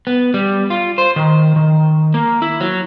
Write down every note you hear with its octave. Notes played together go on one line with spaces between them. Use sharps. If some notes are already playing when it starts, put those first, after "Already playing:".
B3
G3
F4
C5
D#3
D#3
A#3
E4
F#3